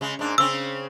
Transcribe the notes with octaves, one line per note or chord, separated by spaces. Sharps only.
C#3 G#3
G#2 A#3 D4
C#3 C4 C#4 E6